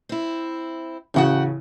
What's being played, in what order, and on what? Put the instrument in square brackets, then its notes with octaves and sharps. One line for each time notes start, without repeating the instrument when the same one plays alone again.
[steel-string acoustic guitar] C4 E4
[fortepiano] A1 C#3 [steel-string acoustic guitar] F#4 F#5 G5